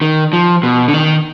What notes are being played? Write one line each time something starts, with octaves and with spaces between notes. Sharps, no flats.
D#3
F3
B2
D3
D#3